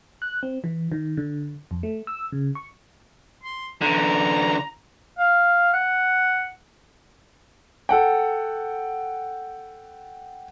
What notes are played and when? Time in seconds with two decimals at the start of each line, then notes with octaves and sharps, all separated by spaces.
0.22 F#6
0.43 C4
0.64 E3
0.92 D#3
1.17 D3
1.71 F2
1.83 A3
2.07 E6
2.32 C#3
2.55 C#6
3.43 C6
3.82 D3 E3 A#5
5.19 F5
5.74 F#5
7.89 A4 F#5 G5